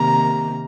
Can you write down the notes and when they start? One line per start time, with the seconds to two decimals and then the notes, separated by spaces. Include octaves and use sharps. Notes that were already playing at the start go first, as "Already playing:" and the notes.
Already playing: C3 D#3 A#3 A#5